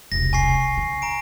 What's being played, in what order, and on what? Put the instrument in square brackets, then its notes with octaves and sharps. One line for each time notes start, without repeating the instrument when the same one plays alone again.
[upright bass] E1 C2 [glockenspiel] A#6
[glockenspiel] G#5 C#6 C7
[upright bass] C#3
[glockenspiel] A#5 D7